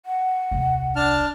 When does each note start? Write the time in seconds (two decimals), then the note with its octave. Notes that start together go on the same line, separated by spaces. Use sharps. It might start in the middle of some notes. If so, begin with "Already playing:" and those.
0.06 F#5
0.51 D#1 C2
0.96 D4 A5 F6